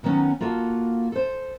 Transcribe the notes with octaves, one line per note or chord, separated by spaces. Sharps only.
D3 D#3 F#3 B3 C#4 D#4
A#3 F4 F#4 A4
A4 C5